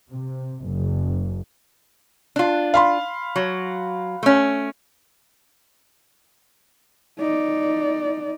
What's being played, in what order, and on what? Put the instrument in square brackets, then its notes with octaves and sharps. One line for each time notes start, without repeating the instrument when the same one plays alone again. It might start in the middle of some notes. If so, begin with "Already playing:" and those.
[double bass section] C3
F#1
[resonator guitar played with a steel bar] D4 F4
[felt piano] F5 B5 C6
[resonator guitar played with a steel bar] F#3
A3 C#4
[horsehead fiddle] D#4 D5